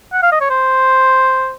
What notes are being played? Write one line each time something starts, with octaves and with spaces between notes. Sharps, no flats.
F#5
F5
D#5
C#5
C5